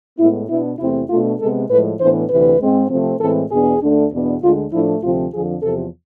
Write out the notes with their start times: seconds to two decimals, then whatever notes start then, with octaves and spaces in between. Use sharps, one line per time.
0.19 A2 G#3 B3 E4
0.49 B2 B3 D4 E4
0.79 E2 C3 E3 A3 C4 E4
1.10 B2 A3 D4 F4
1.40 C3 G#3 B3 A4
1.70 A2 F3 G#3 B4
2.00 A2 E3 B3 D4 C5
2.30 D2 C3 E3 B4
2.61 G#2 G#3 C4
2.90 C3 F3 A3 C4
3.20 A2 E3 G#3 C4 A4
3.51 E2 B2 B3 D4 G#4
3.81 D2 D3 A3 D4
4.12 E2 B2 B3 D4
4.42 D2 D3 G#3 D4 F4
4.72 A2 F3 A3 D4 E4
5.02 D2 C3 F3 A3 C4 F4
5.32 F2 D3 F3 G#4
5.62 E2 C3 F3 A4